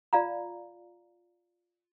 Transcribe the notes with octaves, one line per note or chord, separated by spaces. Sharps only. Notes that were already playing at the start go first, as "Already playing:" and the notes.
F4 D5 F5 A#5